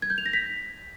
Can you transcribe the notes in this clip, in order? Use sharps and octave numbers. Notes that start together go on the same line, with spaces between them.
G#6
G6
F7
A#6
B6